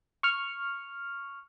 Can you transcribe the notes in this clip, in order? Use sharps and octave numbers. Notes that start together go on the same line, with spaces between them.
C#6 F6